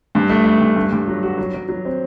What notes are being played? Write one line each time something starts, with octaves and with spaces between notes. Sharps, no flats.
G2
A3
A3
G2
G2
G2
F#3
F#4
F#3
F#3
F#3
C4